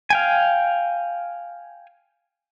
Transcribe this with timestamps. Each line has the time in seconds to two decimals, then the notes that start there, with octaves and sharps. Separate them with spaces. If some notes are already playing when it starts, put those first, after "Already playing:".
0.10 F5 G5 G#5